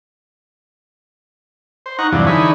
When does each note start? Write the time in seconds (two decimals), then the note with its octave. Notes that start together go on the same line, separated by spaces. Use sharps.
1.86 C5
1.98 D#4 F#5 A#5 C#6
2.12 E2 G2 C3 F3 F#3 D4
2.27 D3 E3 D#4 G#4 C#5 B5